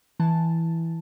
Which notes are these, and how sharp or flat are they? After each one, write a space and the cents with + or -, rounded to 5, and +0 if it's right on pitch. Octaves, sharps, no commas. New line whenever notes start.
E3 +0 A5 +0